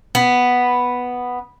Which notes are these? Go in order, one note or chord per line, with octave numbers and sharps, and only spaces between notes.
B3